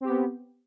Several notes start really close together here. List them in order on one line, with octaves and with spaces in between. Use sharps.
C4 G4 B3